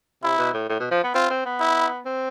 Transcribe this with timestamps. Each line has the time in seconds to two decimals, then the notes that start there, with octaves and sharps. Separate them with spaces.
0.23 C3 E4
0.38 B2
0.53 A2
0.69 A2
0.80 B2
0.91 F3
1.03 B3
1.15 C4 F4
1.30 C4
1.45 B3
1.60 E4
2.06 C4